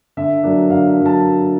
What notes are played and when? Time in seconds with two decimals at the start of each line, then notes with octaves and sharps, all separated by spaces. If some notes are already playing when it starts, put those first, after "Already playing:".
0.17 D3 E5
0.44 F#3 A#3 D4
0.70 D3 F5
0.97 F#3 A#3 D4
1.06 A5